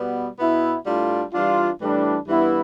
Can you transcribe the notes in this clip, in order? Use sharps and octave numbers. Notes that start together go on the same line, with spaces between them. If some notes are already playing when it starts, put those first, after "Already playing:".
Already playing: B2 G3 B3
B2 B3 E4
A2 G3 D4 F4
E3 G3 D4 F4
A2 E3 G3 D4
G2 E3 B3 E4